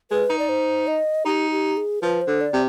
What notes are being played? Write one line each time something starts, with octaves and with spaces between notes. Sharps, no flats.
G#3 B4
D#4
D5
C5
D#5
D#4 G4
G4
G#4
F3 B4
C5
D3
D5
C3